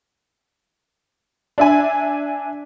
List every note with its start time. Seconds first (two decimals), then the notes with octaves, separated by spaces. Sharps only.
1.58 D4 E5 G#5